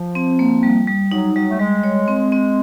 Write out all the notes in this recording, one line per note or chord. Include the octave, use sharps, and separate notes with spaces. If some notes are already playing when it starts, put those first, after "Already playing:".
Already playing: F3
C4
A#3
G3
G3
F#3 D#4
F#3 G3
A3
G3 G#3
C#5
C4
C4